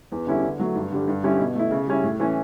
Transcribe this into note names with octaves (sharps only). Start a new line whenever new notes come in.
E2
D3 G3 C#4 E4
D3
F#3 A3
G2
D3 G3 D4
G2
D3 G3 C#4 E4
B2
A3 E4
C#3
G3 C#4 E4
A2
E3 A3 C#4